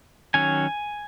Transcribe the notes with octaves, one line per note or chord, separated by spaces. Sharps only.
D#3 F#3 C#4 G#5